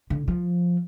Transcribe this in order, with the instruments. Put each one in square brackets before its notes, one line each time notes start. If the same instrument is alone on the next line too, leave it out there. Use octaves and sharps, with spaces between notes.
[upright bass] D3
F3